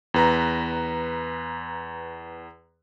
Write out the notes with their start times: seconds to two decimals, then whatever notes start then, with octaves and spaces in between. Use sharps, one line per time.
0.14 E2 B4 A#5